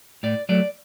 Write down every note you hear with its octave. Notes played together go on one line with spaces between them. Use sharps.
A2 D5
F#3 A3 D5